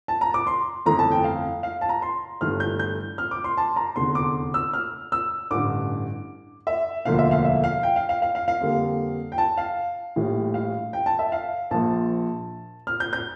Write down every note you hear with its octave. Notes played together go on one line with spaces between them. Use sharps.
A5
A#5
D6
C6
G1 F2 E3 A3 A#5
A5
G5
F5
F5
A5
A#5
C6
G1 G2 E3 A3 F6
G6
G6
F6
D6
C6
A5
A#5
F1 E2 D3 C6
D6
E6
F6
E6
A1 G2 D3 D6
E5
E1 D2 D3 F3 A#3 F5
E5
F5
E5
F5
G5
F5
F5
F5
F5
F5
F2 D3 G3 A#3
G5
A5
F5
A#1 A2 E3 G3
F5
G5
A5
E5
F5
A#1 A#2 F3 A5
F6
G6
G6